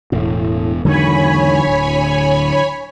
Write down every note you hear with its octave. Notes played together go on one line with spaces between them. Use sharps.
E1 A2
E2 G#2 D3 D#3 F#3 C#5 G#5 B5
D1